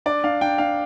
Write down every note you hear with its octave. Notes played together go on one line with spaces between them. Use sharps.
D4 D5
D4 F5
D4 G5
D4 F5